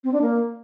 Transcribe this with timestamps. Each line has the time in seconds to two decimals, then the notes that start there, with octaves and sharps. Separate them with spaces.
0.04 C4
0.13 D4
0.22 A#3